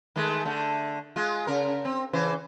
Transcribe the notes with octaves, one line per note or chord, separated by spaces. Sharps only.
D#3 G#3 A3
D3 A3
G#3 F4
C#3 A#4
C4
C#3 E3 C5